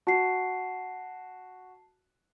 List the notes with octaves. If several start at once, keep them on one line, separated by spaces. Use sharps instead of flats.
F#4 A5 C7